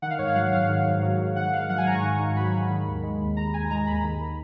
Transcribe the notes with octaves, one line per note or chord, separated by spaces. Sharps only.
D#3 F#5
F5
G#2 C#5
F5
F#3 F#5
G#2 F5
D#3
G#2
F#3
G#2
D#3 F#5
G#2 F5
F#3 F#5
G#5
G#2 A#5
C#6
D#3
G#2
F#3 B5
G#2
D#3
D#2
G#3
D#2
D#3 A#5
D#2 G#5
G#3 A#5
D#2 B5
D#3